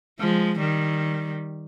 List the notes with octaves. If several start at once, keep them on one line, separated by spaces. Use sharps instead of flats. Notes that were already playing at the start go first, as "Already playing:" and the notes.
F3 G#3
D#3 G3